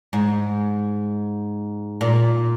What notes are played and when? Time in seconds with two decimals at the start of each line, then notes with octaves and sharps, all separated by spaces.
0.13 G#2
2.01 A#2